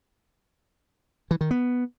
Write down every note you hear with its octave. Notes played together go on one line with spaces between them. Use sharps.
E3
D#3
B3